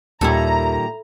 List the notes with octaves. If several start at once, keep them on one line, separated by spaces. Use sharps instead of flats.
D#2 A#2 D#3 G3 E4 A4 A#5